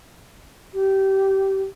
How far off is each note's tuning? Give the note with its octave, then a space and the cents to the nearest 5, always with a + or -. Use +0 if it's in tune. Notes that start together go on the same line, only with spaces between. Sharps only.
G4 -20